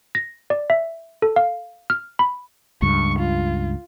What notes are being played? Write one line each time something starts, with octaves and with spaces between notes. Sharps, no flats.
A#6
D5
E5
A4
F5
F6
B5
C#2 G2 C#6
F4